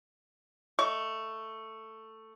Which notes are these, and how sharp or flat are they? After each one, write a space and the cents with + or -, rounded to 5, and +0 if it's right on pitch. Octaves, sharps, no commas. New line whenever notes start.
A3 +10 D#5 +0 C#6 +25